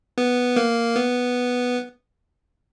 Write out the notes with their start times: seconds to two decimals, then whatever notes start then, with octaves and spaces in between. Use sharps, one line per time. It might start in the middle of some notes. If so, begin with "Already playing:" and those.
0.18 B3
0.56 A#3
0.96 B3